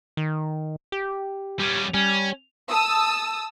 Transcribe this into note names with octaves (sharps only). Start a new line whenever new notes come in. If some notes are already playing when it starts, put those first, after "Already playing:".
D#3
G4
G3 C#4
G3 C#4
A5 D#6 E6